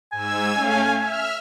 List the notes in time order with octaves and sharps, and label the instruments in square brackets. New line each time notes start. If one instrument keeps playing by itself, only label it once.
[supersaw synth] G#2 E6 G#6 [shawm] G#5
[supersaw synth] A3 C#4 F5
E5 F6